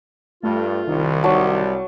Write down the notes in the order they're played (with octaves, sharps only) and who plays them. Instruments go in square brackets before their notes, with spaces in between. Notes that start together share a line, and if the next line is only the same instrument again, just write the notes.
[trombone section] G2 [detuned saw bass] A3 [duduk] F4
[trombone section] C2 [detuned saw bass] D#3
[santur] F#3 A5 [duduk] G3